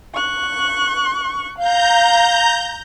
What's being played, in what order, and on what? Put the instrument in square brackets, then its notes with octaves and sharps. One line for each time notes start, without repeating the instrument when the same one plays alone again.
[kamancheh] C#6 F#6
[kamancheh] F5 [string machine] A#5 G6